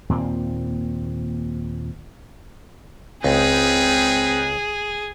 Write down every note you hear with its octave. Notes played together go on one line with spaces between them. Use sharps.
D#2 A#2 C4
C#2 G3 C4 D#4 G#4 B4